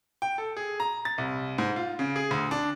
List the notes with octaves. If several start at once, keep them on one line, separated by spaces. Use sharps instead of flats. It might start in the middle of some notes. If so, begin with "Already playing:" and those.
G5
A4
G#4
A#5
A6
C2
G#2
F4
C#3
G#4
D2
D4